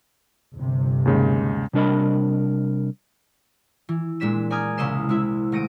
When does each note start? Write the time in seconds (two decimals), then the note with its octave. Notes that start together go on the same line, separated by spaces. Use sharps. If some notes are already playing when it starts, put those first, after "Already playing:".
0.59 G1 C3
1.05 D#2 C#3 G#3
1.73 C3 G3 D4 A#4 D#5 B5
3.89 E3
4.20 A#2 G#3 D4 B6 E7
4.50 D5 G#5 A#5 D#6 F6 G#6
4.77 C2 C#3 E4 D#5 C7 E7
5.09 G#3 C4 E4 E5
5.52 D#1 A3 A#6 D7 D#7